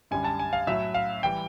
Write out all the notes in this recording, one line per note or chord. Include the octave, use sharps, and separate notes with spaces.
F#2 D3 G3 G#5
A5
G#5
F5
A2 F#3 E5
F5
E3 G3 G5